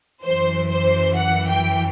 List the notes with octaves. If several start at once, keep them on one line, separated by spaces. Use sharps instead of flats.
F#2 E3 C5
C5
F#5
G5